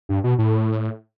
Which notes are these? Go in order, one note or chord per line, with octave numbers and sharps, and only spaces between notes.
G2
B2
A2